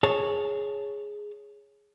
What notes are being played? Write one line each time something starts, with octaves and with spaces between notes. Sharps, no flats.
G#4 C#5 A5